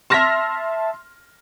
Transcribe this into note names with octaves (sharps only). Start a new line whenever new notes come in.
E5 A5 C6 F6 A#6